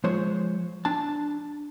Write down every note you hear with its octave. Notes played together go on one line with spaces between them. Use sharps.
F3 G#3 C5 C#5
D4 A5